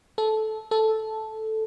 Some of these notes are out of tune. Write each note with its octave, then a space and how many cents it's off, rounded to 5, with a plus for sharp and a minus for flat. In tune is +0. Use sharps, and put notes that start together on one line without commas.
A4 -15
A4 -5